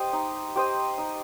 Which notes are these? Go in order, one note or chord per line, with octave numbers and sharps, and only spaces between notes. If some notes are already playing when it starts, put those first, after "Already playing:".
Already playing: G4 C5 D#5
D#4
G4 C5 D#5
D#4